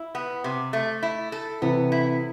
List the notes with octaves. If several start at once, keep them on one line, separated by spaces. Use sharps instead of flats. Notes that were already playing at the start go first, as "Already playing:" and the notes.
Already playing: E4
B3
C3
A3
E4
A4
C3 E3 B3
E4